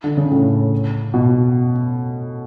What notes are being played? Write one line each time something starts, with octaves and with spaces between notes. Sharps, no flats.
D3
C#3
A2
B2